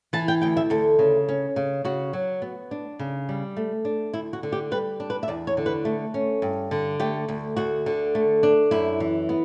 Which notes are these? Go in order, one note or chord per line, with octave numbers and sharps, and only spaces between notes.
E3 A5
G5
D2 G5
E5
D2 A4
C#3
C#4
C#3
C#3 F#4
F#3
B3
D4
C#3
G3
A3
D4
D2 E4
F#4
D3
G4
G3 B4
D4
B4
E5
E2 D5
C#5
D3
B4
A3
C#4
G2
D3
A3 G4
D2
D2 F#4
D3
A3
D4
F#2 E4
E3
B3